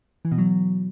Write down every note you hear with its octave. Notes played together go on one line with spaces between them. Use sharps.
E3
B2
F#3